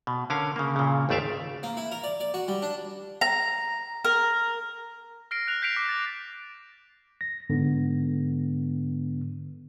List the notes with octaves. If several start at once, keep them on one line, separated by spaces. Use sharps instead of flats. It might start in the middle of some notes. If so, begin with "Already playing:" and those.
B2
D3 C#4 A#4 F5
C#3 A#3
A#2 C#3
G#1 D#2 A3 D5 E5 F5
A#3
E4
A#4
D5
D5
F#4
G3
D4
A#5
A#4
F6 A#6 C7 D7
F#6 F7
G6 B6 C7 D7 F7
D6
A6
A#6
G#2 D3 B3